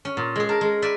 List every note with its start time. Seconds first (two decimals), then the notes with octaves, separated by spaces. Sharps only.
0.05 C#4
0.17 A#2
0.36 G#3 G#4
0.49 A#4 A5
0.61 G#3
0.82 B4 D5 E5